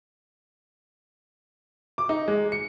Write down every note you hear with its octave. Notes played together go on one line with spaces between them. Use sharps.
D6
D#4
G#3
C#7